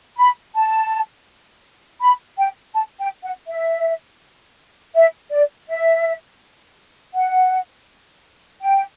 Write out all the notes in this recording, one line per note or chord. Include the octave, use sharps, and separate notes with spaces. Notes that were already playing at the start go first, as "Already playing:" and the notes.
B5
A5
B5
G5
A5
G5
F#5
E5
E5
D5
E5
F#5
G5